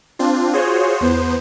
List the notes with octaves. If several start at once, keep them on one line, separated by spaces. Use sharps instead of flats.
C4 D4 F4
F4 F#4 G#4 C5 C#5
E2 B3 C5